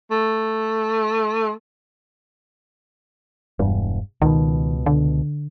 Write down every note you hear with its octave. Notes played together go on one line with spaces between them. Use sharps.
A3
E1 G2
C#2 B2 D#3
D3